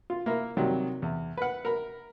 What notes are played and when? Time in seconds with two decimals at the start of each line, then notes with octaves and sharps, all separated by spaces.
0.10 F4
0.26 A#3 E4 A#4
0.57 C3 D#3 F#3 G3
1.02 E2
1.37 B4 F#5
1.65 A#4 B5